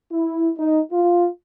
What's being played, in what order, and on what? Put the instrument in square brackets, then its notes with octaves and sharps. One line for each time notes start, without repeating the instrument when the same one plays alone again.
[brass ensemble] E4
D#4
F4